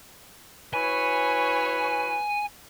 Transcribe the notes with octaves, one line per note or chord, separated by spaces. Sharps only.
E4 F#4 B4 C#5 G#5